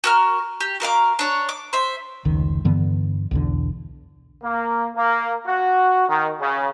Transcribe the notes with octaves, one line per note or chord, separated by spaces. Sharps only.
F#4 A#4 F6
G4
F#4 A#4 F5 D6
D4 C#5
D6
C5 E5
F1 C#2 D#3
G2 D3 E3 B3
B1 E2 D3
A#3
A#3
F#4
D#3
C#3